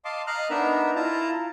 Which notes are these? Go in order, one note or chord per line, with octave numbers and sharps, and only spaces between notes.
D#5 F5 A5 C6 D6
D#5 F5 A#5 F6 F#6
B3 D4 D#4 A#4 E5 A#5
E4 F4 A5 A#5